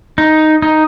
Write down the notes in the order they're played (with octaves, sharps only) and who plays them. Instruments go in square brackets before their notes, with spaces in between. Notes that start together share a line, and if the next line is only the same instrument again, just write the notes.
[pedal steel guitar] D#4
D#4